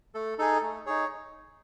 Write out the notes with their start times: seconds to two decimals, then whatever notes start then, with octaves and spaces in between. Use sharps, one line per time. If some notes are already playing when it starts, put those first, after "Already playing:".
0.15 A3 A4
0.39 D#4 G#4 A4
0.62 A3
0.86 D#4 G#4 C#5